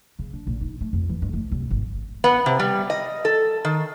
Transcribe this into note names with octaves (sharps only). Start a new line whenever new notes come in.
C#3
D4
A#1
D#4
A3
F2
E3
G2
A3
C2
G#1
B3
C3
G3
D#5
A4
D#3